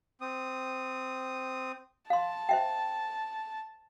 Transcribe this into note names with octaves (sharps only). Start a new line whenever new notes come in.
C4 D#6
F5 A5 C6
C5 E5 G5